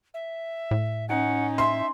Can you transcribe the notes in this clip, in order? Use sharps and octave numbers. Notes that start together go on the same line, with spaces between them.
E5
A2
C#4 D#4 F#5
E5 C6